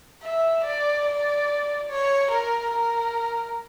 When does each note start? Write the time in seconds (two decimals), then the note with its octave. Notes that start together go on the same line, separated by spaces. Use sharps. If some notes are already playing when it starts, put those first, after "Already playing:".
0.23 E5
0.64 D5
1.07 D5
1.90 C#5
2.31 A#4
2.73 A#4